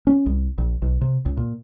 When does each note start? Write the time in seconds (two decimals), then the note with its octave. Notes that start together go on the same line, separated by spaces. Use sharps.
0.07 C#4
0.26 C2
0.58 A#1
0.82 B1
1.01 C3
1.26 C#2
1.37 A#2